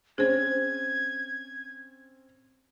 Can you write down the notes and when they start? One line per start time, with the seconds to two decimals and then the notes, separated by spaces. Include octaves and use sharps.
0.18 C4 C#4 G#4 C5 G#6